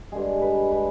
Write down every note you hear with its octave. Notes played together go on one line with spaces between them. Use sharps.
G2 D3 G#3 G#4
B4
D3 G#3 B4